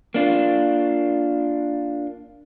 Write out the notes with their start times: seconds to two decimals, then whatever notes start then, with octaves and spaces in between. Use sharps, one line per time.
0.14 A#3 D4 F4